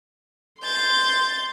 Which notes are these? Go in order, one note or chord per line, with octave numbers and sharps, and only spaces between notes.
C6 G6 A6